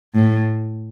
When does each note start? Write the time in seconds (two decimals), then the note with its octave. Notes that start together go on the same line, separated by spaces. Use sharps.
0.15 A2